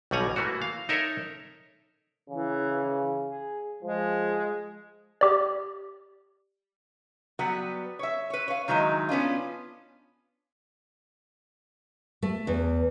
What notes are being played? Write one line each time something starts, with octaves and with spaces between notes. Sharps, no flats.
B1 B2 G3 F#5 G#5 A#5
E3 A3 A#3 F#4
F5
D#4 A4 A#4 C#5 E5
C#3 E3
G#4
F3 G#3
G4 D5
F#3 G3 B3 F#5
C#5 E5
B4 C#5
C#5 F5
D#3 F#3 G#3 D#4 E4
B3 C#4 D4 F4
A3
E2